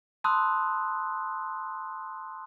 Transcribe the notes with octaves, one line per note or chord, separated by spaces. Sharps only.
A5 B5 C6 D#6 E6 F#6